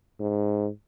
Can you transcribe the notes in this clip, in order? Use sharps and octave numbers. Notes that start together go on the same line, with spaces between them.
G#2